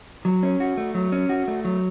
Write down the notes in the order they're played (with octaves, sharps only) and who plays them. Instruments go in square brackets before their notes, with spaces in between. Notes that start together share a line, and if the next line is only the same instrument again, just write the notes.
[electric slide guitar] F#3
C#4
F#4
A3
F#3
C#4
F#4
A3
F#3